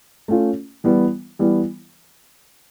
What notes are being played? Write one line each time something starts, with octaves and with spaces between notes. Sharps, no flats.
A3 C#4 F4
E3 G3 B3
E3 G3 B3